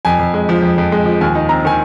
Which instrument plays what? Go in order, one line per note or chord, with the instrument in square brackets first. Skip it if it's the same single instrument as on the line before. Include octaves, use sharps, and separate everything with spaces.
[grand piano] F2 G#5
F2
G#3
F3
F2
F2
G#3
F3
D#2 G#5
D#4
C4 A#5
D#3 G#5